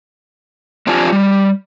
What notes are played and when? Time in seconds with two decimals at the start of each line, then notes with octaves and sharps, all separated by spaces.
0.87 F2 C4 D4 F4 G4 G#5
1.12 G3